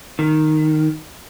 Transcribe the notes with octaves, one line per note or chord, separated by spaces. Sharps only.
D#3